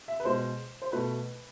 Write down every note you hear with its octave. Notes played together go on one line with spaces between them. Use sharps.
E5
B4
B2 G#3 C5
C5
B2 A3 B4